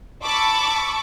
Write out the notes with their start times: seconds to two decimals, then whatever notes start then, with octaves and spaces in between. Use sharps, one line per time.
0.24 A5 B5 C#6 D6 E6